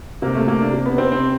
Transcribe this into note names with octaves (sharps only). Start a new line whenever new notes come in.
C3 A#3
A3
C3 A#3
D4
C3
B3
C3 C4
C4